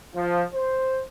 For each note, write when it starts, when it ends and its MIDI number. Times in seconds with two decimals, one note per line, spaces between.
0.13 0.43 53
0.53 1.02 72